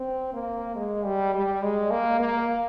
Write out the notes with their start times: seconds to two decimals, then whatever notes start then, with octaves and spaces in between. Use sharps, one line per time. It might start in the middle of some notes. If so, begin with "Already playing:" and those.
Already playing: C4
0.33 A#3
0.76 G#3
1.05 G3
1.34 G3
1.63 G#3
1.91 A#3
2.20 A#3